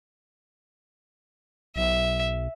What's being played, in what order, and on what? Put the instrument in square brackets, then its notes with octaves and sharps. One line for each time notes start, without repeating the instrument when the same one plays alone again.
[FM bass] B1 [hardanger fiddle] E5